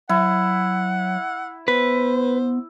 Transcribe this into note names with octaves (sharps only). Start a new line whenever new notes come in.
F#3 E4 F#5
B3 B4 C5